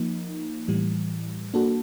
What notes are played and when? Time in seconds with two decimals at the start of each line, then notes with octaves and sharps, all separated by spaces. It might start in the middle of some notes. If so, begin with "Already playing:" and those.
Already playing: F3 A#3 D#4
0.68 A2 E3 G3
1.54 A#3 D4 F#4 A4